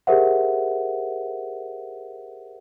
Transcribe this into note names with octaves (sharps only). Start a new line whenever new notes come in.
G4 G#4 A#4 C5 E5 F#5